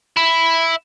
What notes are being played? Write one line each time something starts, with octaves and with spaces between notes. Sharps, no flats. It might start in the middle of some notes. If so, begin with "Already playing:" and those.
E4